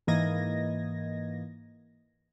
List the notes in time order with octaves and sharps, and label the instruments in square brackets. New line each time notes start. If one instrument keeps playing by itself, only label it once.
[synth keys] G#2 E3 A#3 D#5 G#6 A#6